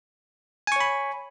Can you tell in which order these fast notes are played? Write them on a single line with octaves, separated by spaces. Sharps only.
G#5 C#6 C#5 B5